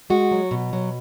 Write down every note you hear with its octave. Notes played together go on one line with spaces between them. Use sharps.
G#3 F#4
F#3
B2
F#3